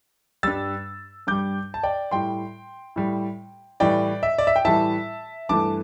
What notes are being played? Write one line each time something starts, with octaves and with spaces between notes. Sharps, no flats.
G2 G3 E6 A6
G2 G3 D6 G6
A5
D5 G5
A2 G3 G5 C6
A2 G3
A2 E3 G3 D5 G5
E5
D5
E5
G5
A2 E3 G3 E5 A5
G2 E3 A3 A5 D6